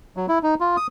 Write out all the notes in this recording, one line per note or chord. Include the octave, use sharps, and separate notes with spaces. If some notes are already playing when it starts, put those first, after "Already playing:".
F#3
E4
D#4
F4
D#6